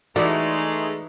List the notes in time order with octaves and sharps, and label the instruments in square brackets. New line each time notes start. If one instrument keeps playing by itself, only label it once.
[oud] E3 A4 [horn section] G#3 A3 [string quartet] D#4 [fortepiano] F#4 D5